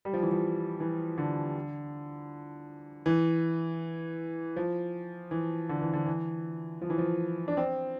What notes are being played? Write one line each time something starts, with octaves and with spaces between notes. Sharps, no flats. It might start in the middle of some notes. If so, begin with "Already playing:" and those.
G3
F3
E3
F3
E3
D3
E3
F3
E3
D3
E3
D3
E3
F3
E3
F3
D4
C4